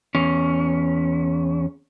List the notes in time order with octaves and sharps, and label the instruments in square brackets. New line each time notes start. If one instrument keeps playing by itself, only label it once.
[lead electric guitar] E2 C#4